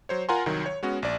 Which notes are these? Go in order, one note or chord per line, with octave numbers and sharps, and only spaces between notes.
F#3 C5 C#5
F4 A#4 F#5 G#5 A#5 C6
C2 D#3 F#3
C#5
G#3 B3 C#4 F#4
A#1 D5